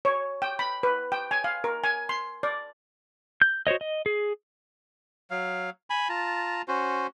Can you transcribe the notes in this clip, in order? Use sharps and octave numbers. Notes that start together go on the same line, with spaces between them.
C#5
G5
B5
B4
G5
G#5
F5
A#4
G#5
C6
D5
G6
F#4 C5 C#5 D#5
D#5
G#4
F#3 F5
G#5 B5
F4 A5 A#5
C#4 F#4 C5